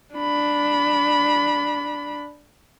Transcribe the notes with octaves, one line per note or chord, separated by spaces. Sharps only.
D4 B5